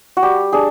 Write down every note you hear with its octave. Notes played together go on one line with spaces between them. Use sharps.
F#4
G3 G4
D4 G#4